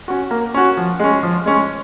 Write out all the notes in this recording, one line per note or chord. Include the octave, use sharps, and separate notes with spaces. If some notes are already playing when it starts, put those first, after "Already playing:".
C#4 F#4
A#3
C#4 F#4
F3
G#3 C#4
F3
G#3 C#4